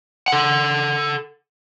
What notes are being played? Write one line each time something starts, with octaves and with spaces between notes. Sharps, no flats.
A4 F#5